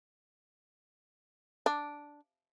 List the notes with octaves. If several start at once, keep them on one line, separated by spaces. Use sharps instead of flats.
D4